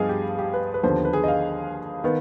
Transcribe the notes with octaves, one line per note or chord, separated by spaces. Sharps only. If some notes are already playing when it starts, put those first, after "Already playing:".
Already playing: G2 F3 B3 G#4 D#5 F5
G4
G4
B4
B4
D#2 D3 F3 B3 C5
B4
G#4
D#5
F5
D#3 B3